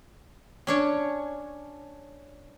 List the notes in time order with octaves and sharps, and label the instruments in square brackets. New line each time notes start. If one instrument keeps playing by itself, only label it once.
[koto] C#4 D4 C#5